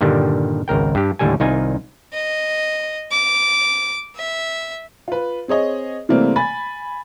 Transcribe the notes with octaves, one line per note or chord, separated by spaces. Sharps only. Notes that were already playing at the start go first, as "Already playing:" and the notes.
G2 A#2 D3 D#3 G3
G#1 C#2 A#4 G5
G2 G4
D#2 A2 D3 G3 A4 G#5
C2 D#3 D#4 F4 G#5
D#5
D6
E5
F4 B4
C4 G#4 C#5 D#5
C3 E3 G3 A3 A#3 C4
G#5 B5 A6